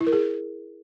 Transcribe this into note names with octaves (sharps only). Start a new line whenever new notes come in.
E4
A#4
G#4